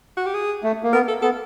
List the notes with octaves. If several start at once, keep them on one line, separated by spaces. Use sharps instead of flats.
F#4
G4
G#4
A3
A#3
B3 A#4
A4
B3 A4